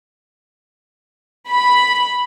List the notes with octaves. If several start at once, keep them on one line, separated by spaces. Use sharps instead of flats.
B5